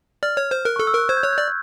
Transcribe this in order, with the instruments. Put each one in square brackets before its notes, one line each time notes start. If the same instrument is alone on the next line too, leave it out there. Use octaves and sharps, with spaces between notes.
[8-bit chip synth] D5 [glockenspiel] F6
[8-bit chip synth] C#5
C5
[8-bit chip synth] A#4 [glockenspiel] F#6
[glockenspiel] C#6
[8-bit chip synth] A4
[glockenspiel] E6
[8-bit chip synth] A#4 [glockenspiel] F#6
[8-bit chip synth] C5 [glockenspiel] G#6
[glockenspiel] G6
[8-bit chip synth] C#5 [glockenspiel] F#6
[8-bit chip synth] D5 [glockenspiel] G6